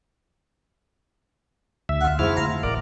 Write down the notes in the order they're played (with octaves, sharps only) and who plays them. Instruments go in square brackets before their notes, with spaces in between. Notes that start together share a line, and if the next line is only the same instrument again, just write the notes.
[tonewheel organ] D2 E5
[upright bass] D3 [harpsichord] F4 F#5
[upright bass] F2 [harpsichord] G#2 F3 [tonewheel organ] E4 F6
[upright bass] D2 [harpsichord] F4 A#5 C6
[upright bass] A1 E4 [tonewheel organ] A#4 D5